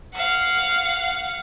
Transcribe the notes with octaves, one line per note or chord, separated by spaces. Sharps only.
F5 F#5